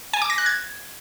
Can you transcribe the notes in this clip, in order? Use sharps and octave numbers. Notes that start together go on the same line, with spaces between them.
G#5
D6
A#6
F#6
G#6